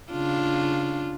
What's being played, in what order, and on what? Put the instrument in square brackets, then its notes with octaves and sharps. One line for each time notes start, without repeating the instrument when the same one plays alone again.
[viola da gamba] C#3 D4 F4